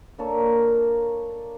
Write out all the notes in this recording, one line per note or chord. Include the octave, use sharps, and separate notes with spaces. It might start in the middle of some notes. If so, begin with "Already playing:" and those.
A#3 D4 A4 C#5